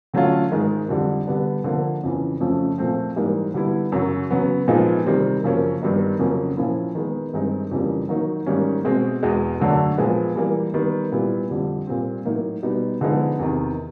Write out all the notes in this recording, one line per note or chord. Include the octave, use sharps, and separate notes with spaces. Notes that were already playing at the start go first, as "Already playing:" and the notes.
D3 F#3 A3 C#4 F4
G#2 D#3 G#3
F2 D3 G3
D3 G3 B3 D4
D3 F3 A#3
F2 C#3 E3
F2 C#3 F3 A3 C#4
A#2 F3 A3 C4
G#2 E3 G3 A#3 D#4
D3 G3 B3 E4
F#2 C#3 F#3
C#3 F#3 B3
A#2 F3 G#3 B3 D#4
C3 D#3 G3 C4
F#2 C#3 F3 A#3 C#4
G2 D#3 G3 B3 D#4
F2 C#3 F#3 A#3 C#4
A#2 F3 A#3 C#4 E4
D#3 G#3 B3
G2 D#3 G#3 C4 D#4
F2 C#3 E3 G3 A#3
D#3 F#3 A#3 D#4
G#2 D#3 G3 A#3 C#4
B2 G#3 C4
E2 B2 G#3
F#2 D3 F#3 A3 D4
A#2 F3 G#3 B3
E3 G3 A#3
D#3 G3 B3
A#2 G3 B3 E4
F2 D3 G3
A#2 G3 C4
A2 F#3 A#3 D#4
B2 G3 B3 D#4
D3 F3 G#3 B3 D#4
E2 C3 D#3